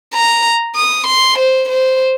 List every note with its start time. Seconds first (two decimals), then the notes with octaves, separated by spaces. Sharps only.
0.14 A#5
0.76 D#6
1.07 C6
1.38 C5
1.69 C5